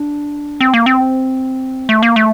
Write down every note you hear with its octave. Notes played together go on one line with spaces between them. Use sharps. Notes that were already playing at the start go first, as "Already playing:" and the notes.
Already playing: D4
C4
A#3
C4
A3
A#3
A3